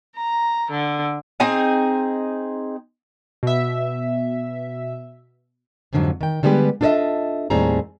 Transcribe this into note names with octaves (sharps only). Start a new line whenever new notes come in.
A#5
D3
C4 D#4 G#4 D#5
B2 E5
F2 G#2 D3 F3 F#3
D#3 G5
D3 G3 G#3 B3 G4 B4
D4 F4 A4 C5 D#5 E5
D#2 A2 G3 C4 G#4 A#5